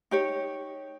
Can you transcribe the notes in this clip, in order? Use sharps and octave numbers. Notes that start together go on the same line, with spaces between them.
D#4 G4 C#5